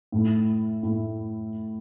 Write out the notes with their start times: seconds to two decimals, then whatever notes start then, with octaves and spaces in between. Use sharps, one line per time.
0.12 A2 A3 E4
0.83 A2 A3 E4